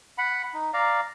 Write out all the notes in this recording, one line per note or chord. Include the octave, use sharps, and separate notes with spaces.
F#5 B5
D#4
D5 F5 A#5